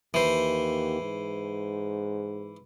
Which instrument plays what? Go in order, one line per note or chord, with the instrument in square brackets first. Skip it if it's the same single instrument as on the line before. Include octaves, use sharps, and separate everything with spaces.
[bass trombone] D#2 [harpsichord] E3 C5
[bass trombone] G#2